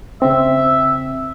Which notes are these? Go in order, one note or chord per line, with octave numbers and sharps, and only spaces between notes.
C#3 C4 E5